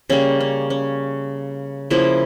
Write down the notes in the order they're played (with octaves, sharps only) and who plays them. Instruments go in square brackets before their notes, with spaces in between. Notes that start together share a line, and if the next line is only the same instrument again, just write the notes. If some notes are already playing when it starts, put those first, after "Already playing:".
[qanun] C#3 G3 A#3 C#4
C#4
C#4
C#3 F3 A#3 E4